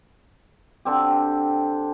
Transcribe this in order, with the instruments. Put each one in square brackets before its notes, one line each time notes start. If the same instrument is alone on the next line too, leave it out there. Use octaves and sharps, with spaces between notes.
[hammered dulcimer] D3 C4 G4